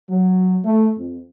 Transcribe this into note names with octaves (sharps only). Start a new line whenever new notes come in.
F#3
A3
F2